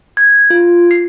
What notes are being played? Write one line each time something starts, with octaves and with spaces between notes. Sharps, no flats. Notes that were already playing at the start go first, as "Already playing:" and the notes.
G#6
F4
C7